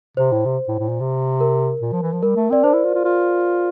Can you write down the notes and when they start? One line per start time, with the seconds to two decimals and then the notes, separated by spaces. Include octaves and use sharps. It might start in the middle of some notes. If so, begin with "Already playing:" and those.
0.17 C3 C5
0.32 A2
0.45 C3
0.68 A2
0.79 A2
0.89 A#2
1.00 C3
1.40 A#4
1.82 A#2
1.92 F3
2.02 E3
2.13 F3
2.23 G3 A#4
2.36 A3
2.50 C4 D5
2.63 D4 C5
2.73 E4
2.84 F4
2.94 F4
3.05 F4